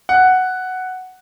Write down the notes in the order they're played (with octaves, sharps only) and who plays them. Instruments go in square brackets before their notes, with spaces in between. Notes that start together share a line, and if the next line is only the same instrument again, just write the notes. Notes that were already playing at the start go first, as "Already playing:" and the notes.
[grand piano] F#5